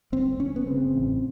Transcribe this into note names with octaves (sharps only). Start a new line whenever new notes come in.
G1 C4
G1 C#4
B3
C#3 C4
A1